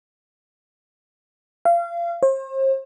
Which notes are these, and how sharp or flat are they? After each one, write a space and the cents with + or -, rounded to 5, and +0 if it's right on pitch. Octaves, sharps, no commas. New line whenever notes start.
F5 -30
C5 +40